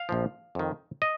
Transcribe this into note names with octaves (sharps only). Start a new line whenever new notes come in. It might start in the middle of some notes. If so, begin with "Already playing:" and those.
Already playing: F5
A#1 A#2 F3
F2 D#3
D#5